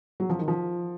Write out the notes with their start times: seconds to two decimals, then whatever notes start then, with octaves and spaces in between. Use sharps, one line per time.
0.20 F#3
0.30 F3
0.39 D#3
0.48 F3